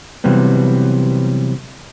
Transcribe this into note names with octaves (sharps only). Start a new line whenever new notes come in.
C3 E3 F#3 G3 B3